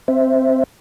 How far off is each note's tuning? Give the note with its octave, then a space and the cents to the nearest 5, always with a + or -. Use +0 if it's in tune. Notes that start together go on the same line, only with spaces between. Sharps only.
C4 +0 C5 +0 E5 +0